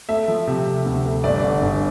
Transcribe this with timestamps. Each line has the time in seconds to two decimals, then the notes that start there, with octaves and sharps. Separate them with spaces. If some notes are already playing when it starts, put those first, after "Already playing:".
0.09 A3 E5
0.28 F3
0.47 C3
0.67 C3
0.86 D2
1.05 A3
1.24 G1 D5
1.44 D3
1.62 G1